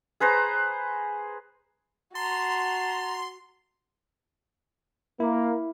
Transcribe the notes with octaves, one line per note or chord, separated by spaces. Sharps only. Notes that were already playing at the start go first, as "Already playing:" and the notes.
G#4 B4 C5 A#5
F#4 A5 A#5 C6
A#3 E4